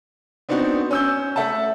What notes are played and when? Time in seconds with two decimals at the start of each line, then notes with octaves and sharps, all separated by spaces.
0.49 B3 C4 D4 D#4 F#4
0.91 C#4 E6 G6
1.36 A3 A4 E5 F#5 A5